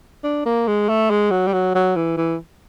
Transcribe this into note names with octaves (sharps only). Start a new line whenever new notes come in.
D4
A#3
G#3
A3
G#3
F#3
G3
F#3
F#3
E3
E3